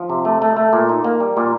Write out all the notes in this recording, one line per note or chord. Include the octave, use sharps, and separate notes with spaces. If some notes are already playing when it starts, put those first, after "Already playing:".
Already playing: F3
C3
A3
A3
A3
A#2
D#4
A#3
G3
A#2